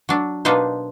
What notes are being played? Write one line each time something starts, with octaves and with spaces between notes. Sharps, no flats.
F#3 D4
B2 A#3 D4 D#4 B4 C5